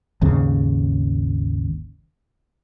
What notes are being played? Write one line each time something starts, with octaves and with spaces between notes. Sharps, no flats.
G#1 D#2 C#3